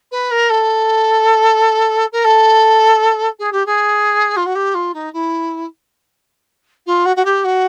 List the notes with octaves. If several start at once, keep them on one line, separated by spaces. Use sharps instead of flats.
B4
A#4
A4
A#4
A4
G#4
G4
G#4
F4
F#4
G4
F4
D#4
E4
F4
F#4
F#4
G4
F#4